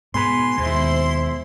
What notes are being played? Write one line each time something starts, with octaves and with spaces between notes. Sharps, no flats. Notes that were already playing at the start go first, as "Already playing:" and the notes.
G#2 B2 B3 G#4 B4 C6
D#2 B2 D#3 G#3 E4 C5